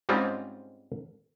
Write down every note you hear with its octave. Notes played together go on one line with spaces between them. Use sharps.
G#2 G3 G#3 C4 C#4 F4